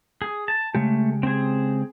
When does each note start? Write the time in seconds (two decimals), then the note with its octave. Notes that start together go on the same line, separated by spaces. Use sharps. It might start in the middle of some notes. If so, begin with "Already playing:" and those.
0.22 G#4
0.48 A5
0.75 C#3 G#3 A3 G4
1.23 C4 G#4